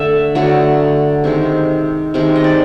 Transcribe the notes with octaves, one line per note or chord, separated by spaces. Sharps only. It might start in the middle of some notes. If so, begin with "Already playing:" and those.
Already playing: D3 A3 E5
D3 F#3 A3
C3 D#3 G#3
C3 D#3 G#3
D#5
D5